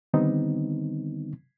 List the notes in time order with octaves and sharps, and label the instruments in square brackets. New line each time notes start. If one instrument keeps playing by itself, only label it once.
[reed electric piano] D3 D#3 G3 B3 C4 D#4